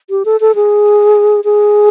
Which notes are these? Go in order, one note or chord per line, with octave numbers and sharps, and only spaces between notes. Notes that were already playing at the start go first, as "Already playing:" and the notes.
G4
A4
A4
G#4
G#4